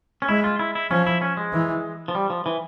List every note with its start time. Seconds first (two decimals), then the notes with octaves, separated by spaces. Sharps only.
0.22 C#4
0.28 G#3 E4
0.44 F4
0.59 E4
0.75 E4
0.91 F3 C#4
1.06 E4
1.22 C#4
1.37 G#3
1.53 E3
2.08 F3
2.15 G3
2.30 F3
2.46 E3